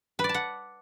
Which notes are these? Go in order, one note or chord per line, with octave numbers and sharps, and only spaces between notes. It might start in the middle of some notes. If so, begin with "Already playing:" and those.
B4
D5
A5
F#5